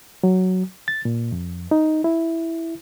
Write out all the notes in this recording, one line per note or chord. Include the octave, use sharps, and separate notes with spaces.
F#3
A6
A#2
F2
D#4
E4